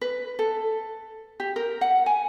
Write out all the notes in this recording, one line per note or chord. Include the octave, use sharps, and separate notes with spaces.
B4
A4
G4
A#4
F#5
G#5